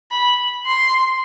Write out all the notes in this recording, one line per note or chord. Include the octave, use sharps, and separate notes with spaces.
B5
C6